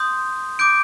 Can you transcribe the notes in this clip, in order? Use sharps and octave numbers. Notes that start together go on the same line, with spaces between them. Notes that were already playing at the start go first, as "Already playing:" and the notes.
Already playing: C6 D#6 G6
D6 G6 D7